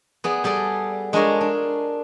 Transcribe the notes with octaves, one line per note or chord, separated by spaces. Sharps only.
B3 G#4 D5
G3 G#4 A4 D5
G#3 D4 F4 G#4 A#4 C#5
D4